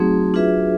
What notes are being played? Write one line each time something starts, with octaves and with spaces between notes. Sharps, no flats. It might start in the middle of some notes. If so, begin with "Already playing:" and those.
Already playing: F#3 A3 C4 D#4 G#4
D4 F4 G#4 B4 E5